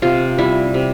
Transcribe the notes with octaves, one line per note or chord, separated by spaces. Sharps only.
C3 F4
G3 E4
C3